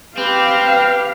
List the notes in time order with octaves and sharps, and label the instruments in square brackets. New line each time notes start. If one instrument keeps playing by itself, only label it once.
[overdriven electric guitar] C4 [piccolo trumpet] G4 [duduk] B4 [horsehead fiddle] F5